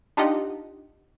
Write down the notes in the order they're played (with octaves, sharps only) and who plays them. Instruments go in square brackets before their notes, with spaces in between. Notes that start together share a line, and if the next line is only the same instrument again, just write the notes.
[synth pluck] D4 D#4 F4 G4 D#5 F#5